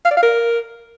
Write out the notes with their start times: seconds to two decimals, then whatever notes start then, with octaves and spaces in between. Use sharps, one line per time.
0.05 F5
0.11 D5
0.17 F5
0.23 A#4